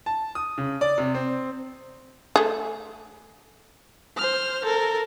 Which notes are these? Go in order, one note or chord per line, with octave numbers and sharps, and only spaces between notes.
A5
D#6
C#3
D5
C3
C4
A3 G#4
C5 F6
A4 A#4